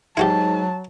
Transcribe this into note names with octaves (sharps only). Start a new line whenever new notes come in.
G#2 F#3 E4 F#4 G4 A5